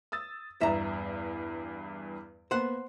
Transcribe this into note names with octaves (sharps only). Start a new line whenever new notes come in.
D#6 E6 A6
E2 G2 E5 A#5
A#3 B3 C5 F#5